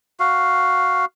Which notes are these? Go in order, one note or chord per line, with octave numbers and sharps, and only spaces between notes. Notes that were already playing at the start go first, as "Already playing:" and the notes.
F#4 F5